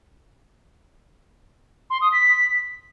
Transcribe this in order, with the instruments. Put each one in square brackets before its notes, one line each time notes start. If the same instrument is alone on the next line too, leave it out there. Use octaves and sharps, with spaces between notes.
[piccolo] C6
D#6
B6